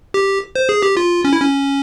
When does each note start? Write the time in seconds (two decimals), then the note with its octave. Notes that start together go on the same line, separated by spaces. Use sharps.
0.14 G4
0.56 C5
0.69 G#4
0.83 G4
0.97 F4
1.24 C#4
1.33 E4
1.40 C#4